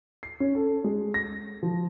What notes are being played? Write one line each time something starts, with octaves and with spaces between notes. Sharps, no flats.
C7
C#4
A4
G#3
A#6
F3